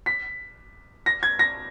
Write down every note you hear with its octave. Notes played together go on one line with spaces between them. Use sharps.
B6
A#6
G#6
A#6